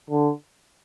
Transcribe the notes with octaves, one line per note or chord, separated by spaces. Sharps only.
D3